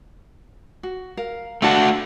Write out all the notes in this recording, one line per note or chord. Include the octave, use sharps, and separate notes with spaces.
F#4
A#4 F5
A3 D4 F#4 F5 A5